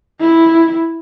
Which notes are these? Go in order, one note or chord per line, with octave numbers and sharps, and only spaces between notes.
E4